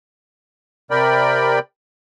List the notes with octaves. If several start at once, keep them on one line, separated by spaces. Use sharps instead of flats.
C3 A#4 D5 G5 B5